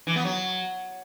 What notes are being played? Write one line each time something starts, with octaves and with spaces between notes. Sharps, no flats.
E3
B3
F#3